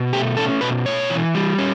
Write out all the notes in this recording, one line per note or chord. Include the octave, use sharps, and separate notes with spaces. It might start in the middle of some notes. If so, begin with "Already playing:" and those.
Already playing: B2
A3 G4
C#4 A4
B2 B4
A2 C#5
E3
G3
C#4